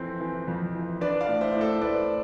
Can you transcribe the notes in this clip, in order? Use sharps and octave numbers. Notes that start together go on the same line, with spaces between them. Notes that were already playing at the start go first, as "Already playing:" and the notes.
Already playing: F2 E3 C4 A4
E3
F2
E3
D4 B4 D5
D5 F5
A2
C5 E5
A2
A4 C5
A2 B4 D5